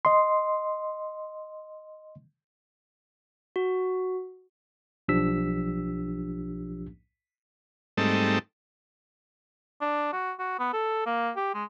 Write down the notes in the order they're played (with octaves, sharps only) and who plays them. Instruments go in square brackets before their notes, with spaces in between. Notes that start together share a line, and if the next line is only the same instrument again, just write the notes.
[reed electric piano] D#5 C6
[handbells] F#4
[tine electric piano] B1 F3 D4 G4 E6 B6
[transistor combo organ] G#2 G3 A3 C4 D#4 A4
[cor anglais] D4
F#4
F#4
B3
A4
A#3
G4
G#3